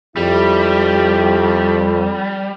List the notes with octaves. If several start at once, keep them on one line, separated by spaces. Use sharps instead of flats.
F2 G3 E4 G4